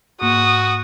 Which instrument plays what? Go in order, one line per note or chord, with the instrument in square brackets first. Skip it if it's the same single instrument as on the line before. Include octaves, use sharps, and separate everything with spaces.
[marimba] G#2 A#3 [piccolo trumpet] F#4 [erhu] D#6